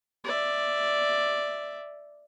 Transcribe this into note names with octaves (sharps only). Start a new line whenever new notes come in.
D5 E5